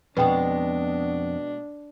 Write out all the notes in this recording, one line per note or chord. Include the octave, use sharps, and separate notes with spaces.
F2 B2 G#3 D4 B4 G5